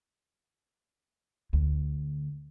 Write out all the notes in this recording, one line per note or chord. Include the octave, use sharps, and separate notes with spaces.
D2